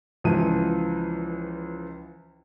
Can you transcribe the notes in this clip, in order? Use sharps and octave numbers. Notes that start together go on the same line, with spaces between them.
C#2 E3 F3 D#4 D#7